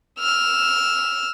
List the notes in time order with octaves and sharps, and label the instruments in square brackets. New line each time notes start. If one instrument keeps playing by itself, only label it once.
[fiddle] E6 F6